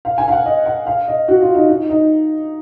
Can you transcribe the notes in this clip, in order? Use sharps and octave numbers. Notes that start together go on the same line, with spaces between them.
F5
G#5
F5
F#5
D#5
F#5
F5
D#5
F#4
F4
D#4
D#4
D#4